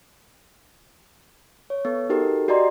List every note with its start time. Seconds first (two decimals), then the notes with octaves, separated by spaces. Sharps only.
1.70 C#5
1.85 B3 A4
2.09 D#4 F#4 G4 A4 A#4
2.48 F#4 G4 D5 D#5 A#5 C6